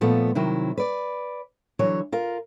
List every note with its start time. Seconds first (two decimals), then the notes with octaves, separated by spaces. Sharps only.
0.01 A#2 F3 A3 B3
0.35 C3 D#3 F#3 E4
0.77 B4 D5
1.79 D3 E3 F#3 C#5
2.12 F4 A#4